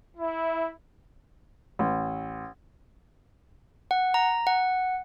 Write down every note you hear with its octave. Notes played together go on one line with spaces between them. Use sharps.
E4
A1
F#5
A#5
F#5